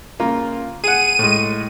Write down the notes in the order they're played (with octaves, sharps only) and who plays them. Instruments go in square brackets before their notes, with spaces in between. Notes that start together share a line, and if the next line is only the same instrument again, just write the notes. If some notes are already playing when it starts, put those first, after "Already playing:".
[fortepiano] C#3 A#3 F4
[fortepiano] G#4 F#5 [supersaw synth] D#7
[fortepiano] A2 G#3